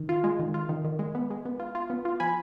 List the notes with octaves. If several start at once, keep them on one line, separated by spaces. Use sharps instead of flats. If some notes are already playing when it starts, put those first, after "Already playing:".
Already playing: D#3
F4
G#3
D#3
F4
D#3
D#3
G#3
B3
G#3
B3
F4
F4
B3
F4
F3 G#5 B5